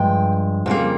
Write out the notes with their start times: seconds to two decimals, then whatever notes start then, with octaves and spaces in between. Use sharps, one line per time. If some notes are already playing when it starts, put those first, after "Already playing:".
Already playing: G2 F3 G#3 G5
0.66 F2 C#3 G3 A#3